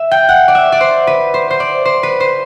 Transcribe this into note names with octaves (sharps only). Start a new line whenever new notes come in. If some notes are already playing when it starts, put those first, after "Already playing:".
Already playing: E5
G5
F#5
D5
E5
D5
C5
B4
C5
C5
D5
C5
B4
C5